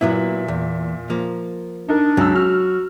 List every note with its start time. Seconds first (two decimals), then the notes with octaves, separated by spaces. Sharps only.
0.01 A#2 F#3 B3 E4 E5
0.48 E2
1.10 F3 A#3
1.89 D4 D#4 A#4
2.17 C#2 F#3 E6
2.36 F#4 F6